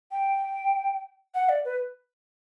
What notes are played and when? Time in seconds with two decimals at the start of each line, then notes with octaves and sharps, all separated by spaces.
0.12 G5
1.35 F#5
1.49 D5
1.65 B4